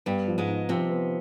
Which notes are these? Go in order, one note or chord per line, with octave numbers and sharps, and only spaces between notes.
G2 G3 B3
F3
G#2 G#3
D#4
C3 F3 C4
B3